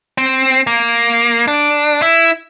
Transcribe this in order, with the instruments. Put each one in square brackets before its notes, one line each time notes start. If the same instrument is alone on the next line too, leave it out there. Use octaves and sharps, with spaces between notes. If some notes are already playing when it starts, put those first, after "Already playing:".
[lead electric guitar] C4
A#3
D4
E4